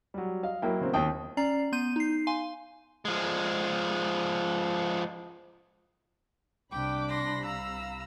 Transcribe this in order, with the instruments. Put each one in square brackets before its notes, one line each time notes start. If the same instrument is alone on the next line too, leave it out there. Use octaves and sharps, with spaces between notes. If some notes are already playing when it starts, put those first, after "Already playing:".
[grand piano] F#3 G3
[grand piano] D#5 [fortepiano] F5
[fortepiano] F#3 A#3 E4 [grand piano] G5 B5
[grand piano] C#3 B3 C4
[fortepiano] D#2 G5 [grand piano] D#6
[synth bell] C#4 D5 A#5 C7
B3 C6 G6 D#7
D#4 C7
F5 G#5 C6
[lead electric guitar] F3 G#3
[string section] C2 C3 B5 [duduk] D4 [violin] G5 [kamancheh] D6
[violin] C6 A#6
[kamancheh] F5 [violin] A#5 E6